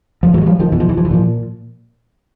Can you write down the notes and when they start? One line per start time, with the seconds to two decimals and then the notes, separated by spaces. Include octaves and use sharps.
0.23 F3
0.33 A2 E3 F#3
0.41 G#3
0.46 F3 G3
0.59 D#3 F3
0.72 B2 E3
0.80 F3
0.89 E3
0.97 F3
1.05 E3
1.11 A#2 F3